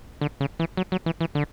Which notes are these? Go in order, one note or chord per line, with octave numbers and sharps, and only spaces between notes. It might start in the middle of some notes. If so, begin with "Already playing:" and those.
D3
C#3
E3
F#3
F#3
E3
E3
D3